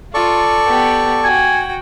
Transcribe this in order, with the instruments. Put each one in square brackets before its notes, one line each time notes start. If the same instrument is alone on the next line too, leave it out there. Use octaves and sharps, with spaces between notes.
[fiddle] F4 [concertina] A4 D5 C#6
[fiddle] B3 G4
[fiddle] F#4 G5 [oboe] G#5